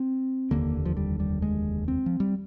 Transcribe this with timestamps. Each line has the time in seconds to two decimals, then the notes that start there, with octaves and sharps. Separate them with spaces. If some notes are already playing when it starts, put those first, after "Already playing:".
Already playing: C4
0.51 F1 D#2 D3 A#3
0.85 F3
0.97 G3
1.20 G3
1.42 G#3
1.88 C4
2.06 F3
2.20 G3